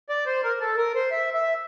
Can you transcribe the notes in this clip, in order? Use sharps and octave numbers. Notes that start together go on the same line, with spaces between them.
D5
C5
A#4
A4
A#4
C5
E5
E5